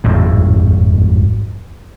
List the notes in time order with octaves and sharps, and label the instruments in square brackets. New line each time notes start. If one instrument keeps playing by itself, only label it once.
[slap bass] D#1 G#1 F2 A2